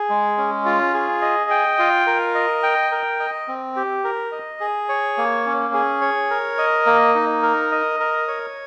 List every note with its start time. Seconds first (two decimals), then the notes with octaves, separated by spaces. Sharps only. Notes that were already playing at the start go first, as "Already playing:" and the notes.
Already playing: G#4
0.10 G#3
0.38 C#4
0.65 F4
0.94 G#4
1.22 D#5
1.50 G5
1.79 F4
2.07 A#4
2.35 D#5
2.63 G5
2.92 A#4
3.20 D#5
3.48 C4
3.76 G4
4.04 A#4
4.32 D#5
4.60 G#4
4.89 C#5
5.18 A#3
5.46 C#4
5.74 G#4
6.01 C#5
6.30 A#4
6.58 D#5
6.86 A#3
7.15 D#4
7.43 A#4
7.72 D#5
8.00 A#4
8.28 C#5